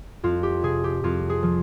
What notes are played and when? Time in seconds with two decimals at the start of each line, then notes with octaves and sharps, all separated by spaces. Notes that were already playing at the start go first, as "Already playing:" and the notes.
0.23 F2 F4
0.43 G4
0.63 C3 G#4
0.84 G4
1.04 F2 F4
1.29 G#4
1.43 F3